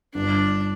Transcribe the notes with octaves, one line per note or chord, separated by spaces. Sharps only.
G1 D4